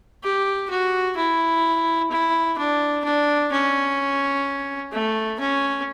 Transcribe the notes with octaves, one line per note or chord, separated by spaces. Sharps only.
G4
F#4
E4
E4
D4
D4
C#4
A3
C#4